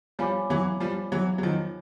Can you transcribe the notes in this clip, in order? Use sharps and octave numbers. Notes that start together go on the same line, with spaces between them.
F3 G3 C#5 F5 G#5 B5 D6
E3 F#3
F3 G3
E3 F#3
F#3
D#3 F3